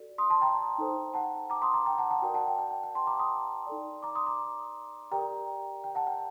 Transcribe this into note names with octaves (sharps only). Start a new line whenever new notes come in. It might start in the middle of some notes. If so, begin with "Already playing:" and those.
Already playing: F#4 A4 D5
C6 D#6
A5 C6
G5 A#5
D#4 A4 C5
F#5 A5
A#5 D6
C6 D#6
A#5 D6
G5 A#5
F#5 A5
F#5 A5
F#4 A#4 D5 G5
F#5 A5
G5
G5
G5
G5
A5 C6
A#5 D6
C6 D#6
D#4 A4 D5
A#5 D6
C6 D#6
A#5 D6
G4 A#4 D5 G5 A#5
G5
F#5 A5
G5